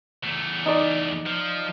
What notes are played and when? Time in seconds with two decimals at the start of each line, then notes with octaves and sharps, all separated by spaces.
0.23 E2 A3
0.66 D#4 D5
1.26 F3